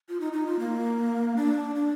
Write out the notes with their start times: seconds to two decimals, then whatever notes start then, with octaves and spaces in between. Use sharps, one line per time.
0.09 F4
0.20 D#4
0.32 D#4
0.46 F4
0.59 A#3
1.36 D4
1.75 D4